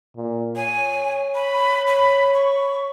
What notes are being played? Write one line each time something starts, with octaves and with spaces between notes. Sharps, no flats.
A#2
C#5 G#5
B5
B5
C#6